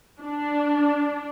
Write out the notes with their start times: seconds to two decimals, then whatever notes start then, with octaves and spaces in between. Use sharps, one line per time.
0.21 D4